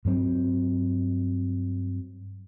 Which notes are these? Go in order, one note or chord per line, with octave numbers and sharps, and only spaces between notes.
G2 F#3 C4